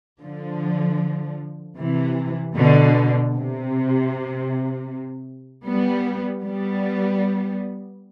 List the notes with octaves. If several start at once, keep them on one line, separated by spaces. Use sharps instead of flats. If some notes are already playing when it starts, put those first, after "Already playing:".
D3 F3
C3 E3
B2 D3
C3
G3 B3
G3 B3